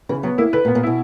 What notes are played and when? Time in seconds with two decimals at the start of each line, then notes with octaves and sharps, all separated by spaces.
0.09 C#3 E3
0.23 F#3 B3
0.38 A#3 E4
0.53 D3 B4
0.65 A#2
0.68 B3
0.75 A#2
0.83 B2 E4